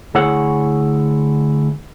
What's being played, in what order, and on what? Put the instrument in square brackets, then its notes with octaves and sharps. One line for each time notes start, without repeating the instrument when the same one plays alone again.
[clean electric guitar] D2 E4 G#4 C#5 F#5